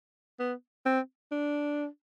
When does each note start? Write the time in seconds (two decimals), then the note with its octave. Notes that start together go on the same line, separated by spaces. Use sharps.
0.40 B3
0.86 C4
1.32 D4